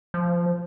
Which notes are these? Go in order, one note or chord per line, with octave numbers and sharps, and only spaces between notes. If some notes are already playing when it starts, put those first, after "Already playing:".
F3